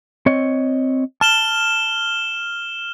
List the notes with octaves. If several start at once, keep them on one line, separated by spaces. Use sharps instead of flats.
C4 C#5 D#5
A5 F6 E7 G7